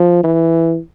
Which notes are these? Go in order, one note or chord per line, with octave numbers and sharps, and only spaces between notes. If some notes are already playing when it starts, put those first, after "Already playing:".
Already playing: F3
E3